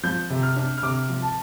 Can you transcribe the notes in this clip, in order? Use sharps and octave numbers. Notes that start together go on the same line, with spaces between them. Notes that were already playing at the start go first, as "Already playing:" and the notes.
F3 G6
C3
F6
D4
F6
C3 D6
F3
A5